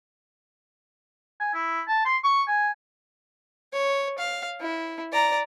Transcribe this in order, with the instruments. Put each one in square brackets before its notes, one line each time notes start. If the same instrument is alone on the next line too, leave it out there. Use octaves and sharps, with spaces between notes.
[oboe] G#5
E4
A5
C6
C#6
G#5
[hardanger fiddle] C#5
F5
E4
D5 A#5